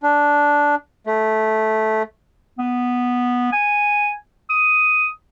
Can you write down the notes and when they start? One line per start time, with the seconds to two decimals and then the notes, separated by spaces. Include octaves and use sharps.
0.03 D4
1.06 A3
2.59 B3
3.52 G#5
4.50 D#6